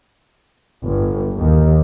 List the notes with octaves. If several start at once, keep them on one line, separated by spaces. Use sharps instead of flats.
G1
D#2